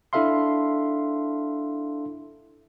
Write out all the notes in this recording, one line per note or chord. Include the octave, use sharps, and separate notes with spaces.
D4 E4 A4 E5 F5 C6